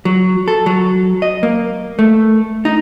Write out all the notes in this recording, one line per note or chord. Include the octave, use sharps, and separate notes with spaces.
F#3
A4
F#3
D#5
A#3
A3
D#4